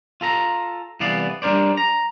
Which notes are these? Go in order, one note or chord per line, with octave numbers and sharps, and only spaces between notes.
F4 A4 A#5
C2 E3 B3 D5 F5
G3 D4 A#4 C5 D5
A#5